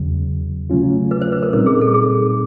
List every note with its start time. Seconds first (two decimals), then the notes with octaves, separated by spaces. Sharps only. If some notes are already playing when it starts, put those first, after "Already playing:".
Already playing: E2 C#3 F#3
0.70 C#3 F#3 A3 C#4 F4
1.11 B4
1.21 C5
1.32 B4
1.42 A#4
1.53 A#2 G3 C4 D#4 A#4
1.66 G#4
1.81 A4
1.94 G#4